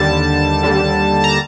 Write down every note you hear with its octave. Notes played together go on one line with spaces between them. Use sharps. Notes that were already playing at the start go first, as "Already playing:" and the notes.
Already playing: D#2 D3 G3 A5
D#2 D3 G3
A#5